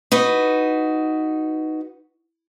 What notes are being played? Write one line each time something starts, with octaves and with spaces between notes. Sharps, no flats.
D#4 F#4 B4